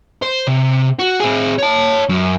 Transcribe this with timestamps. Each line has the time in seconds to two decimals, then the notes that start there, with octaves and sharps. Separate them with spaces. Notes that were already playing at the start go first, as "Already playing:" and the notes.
0.22 C5
0.48 C3
0.99 F#4
1.20 C4 G#4
1.58 C#5 A5
2.09 F#2